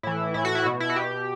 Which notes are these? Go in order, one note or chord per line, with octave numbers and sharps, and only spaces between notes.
A2 E3 E4
A2 E3 E4
F#4
E4
B2
E4
F#4
B2 G4